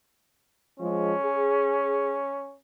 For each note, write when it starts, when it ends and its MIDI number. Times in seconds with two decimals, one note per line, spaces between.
0.80 1.12 53
0.80 1.12 56
0.80 2.57 61
1.21 2.18 68